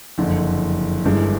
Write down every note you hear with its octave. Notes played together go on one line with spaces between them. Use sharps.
F#1 F2 D3
G1 G2 E3 G#3